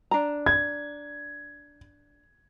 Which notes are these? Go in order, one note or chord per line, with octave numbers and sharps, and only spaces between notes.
D4 A#5
G#6